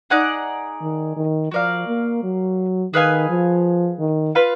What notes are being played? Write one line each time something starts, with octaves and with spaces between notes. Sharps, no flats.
D#4 G#4 D5 F#5
D#3
D#3
F3 F#4 A#4 D5 F5
A#3
F#3
D#3 G#4 B4 F5 G#5
F3
D#3
F4 B4 F5